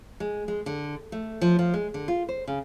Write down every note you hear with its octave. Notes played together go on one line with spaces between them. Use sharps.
G#3
G#3
D3
A3
F3
F3
G#3
D3
F4
C5
C#3